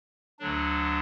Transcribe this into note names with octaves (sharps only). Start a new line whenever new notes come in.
D2 D3 F#3 D4